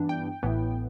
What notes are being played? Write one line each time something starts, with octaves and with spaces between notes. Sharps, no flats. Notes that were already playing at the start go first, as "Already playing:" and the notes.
Already playing: G2 E3 B3 D4
G5
A1 A2 E3 B3